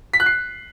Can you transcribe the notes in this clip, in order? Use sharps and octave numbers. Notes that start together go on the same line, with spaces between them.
B6
F#6
C7